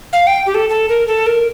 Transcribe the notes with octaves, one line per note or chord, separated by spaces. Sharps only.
F5
G5
G4
A4
A4
A#4
A4
A#4